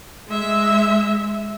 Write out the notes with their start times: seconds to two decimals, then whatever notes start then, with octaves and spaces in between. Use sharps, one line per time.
0.28 G#3 E5